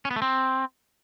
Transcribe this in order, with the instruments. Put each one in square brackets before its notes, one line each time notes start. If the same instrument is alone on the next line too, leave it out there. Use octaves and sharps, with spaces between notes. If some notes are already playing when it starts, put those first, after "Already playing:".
[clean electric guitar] C#4
B3
A3
C4